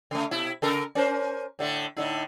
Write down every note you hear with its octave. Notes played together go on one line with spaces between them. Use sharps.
C#3 A3
B2 E4
C#3 A4 A#4
C#4 A#4 C5
A2 D3 A3
A2 D3 D#4